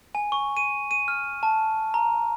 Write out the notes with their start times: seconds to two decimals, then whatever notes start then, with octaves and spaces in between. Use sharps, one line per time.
0.15 G#5
0.32 C#6
0.57 D#7
0.91 D#7
1.08 F6
1.43 A5
1.94 A#5